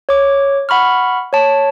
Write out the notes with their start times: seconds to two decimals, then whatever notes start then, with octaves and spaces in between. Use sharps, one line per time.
0.09 C#5 D6
0.69 F#5 B5 C#6 F6
1.33 C#5 A5